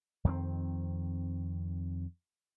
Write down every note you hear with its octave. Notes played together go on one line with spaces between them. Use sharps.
F2 D#3 A#3 C4